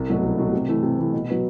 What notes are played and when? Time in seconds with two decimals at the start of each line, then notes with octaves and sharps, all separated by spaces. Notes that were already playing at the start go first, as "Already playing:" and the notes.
Already playing: C2
0.08 B2 F#3 A3
0.23 C2
0.38 B2 F#3 A3
0.53 C3
0.68 E3 A3
0.83 C3
0.98 E3 A3
1.13 B2
1.29 F#3 B3 F#4